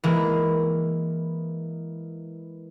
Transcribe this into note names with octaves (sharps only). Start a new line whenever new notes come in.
E3 G#3 A#3